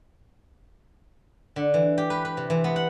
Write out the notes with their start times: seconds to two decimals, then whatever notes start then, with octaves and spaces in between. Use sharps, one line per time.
1.56 D3
1.74 E3
1.98 G4
2.10 B4
2.25 B4
2.37 C3
2.50 E3
2.64 B3
2.76 F#5